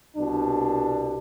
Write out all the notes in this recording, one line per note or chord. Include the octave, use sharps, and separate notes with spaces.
C2 B2 D4